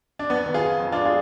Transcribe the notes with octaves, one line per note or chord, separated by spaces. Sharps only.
D4
F2 B3
D#3
F4 G#4
F2
F2
D4 F4
G#3
F4 G#4